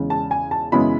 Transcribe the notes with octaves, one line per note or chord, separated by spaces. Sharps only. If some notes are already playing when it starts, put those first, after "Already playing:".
Already playing: E1 E2 C#3 G#3
A5
G#5
A5
F#2 C#3 E3 G#3 B3 B5